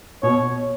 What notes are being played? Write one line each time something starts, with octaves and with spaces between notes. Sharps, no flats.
B2 C#5